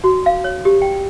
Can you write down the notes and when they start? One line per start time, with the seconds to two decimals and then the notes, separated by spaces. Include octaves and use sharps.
0.04 F#4
0.26 F5
0.44 C#5
0.65 G4
0.82 G5